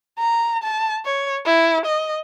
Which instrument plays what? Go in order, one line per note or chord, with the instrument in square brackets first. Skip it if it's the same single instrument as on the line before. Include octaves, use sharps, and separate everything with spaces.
[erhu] A#5
A5
C#5
E4
D#5